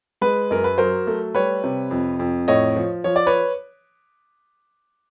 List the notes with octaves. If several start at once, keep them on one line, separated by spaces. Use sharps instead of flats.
G#3 B4
F#2 A#4
B4
F#3 A#4 C5
A3
G3 B4 C#5
C3
F2
F2
A2 C#5 D#5
F3
F3 C#5
D5
B4 C#5